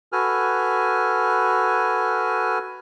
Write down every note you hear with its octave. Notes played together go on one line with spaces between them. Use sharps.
F#4 A4 B4 G#5 F6